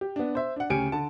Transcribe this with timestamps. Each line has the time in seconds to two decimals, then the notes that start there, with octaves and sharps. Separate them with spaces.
0.01 G4
0.16 B3 D4
0.35 C5 E5
0.56 D4 F#5
0.70 D2 C#3 G4 G#5 C#7 D7
0.92 D3 A5